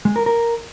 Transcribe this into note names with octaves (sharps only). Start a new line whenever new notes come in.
G#3
A#4
A#4